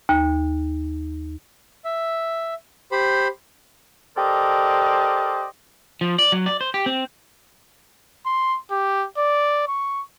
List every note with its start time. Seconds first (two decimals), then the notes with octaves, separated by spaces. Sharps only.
0.09 D#2
1.85 E5
2.91 G4 C5 B5
4.18 G4 A4 A#4 C5 D5 D#5
6.01 F3
6.19 D5
6.32 F#3
6.46 D5
6.61 C5
6.74 G4
6.86 C4
8.26 C6
8.71 G4
9.18 D5
9.68 C#6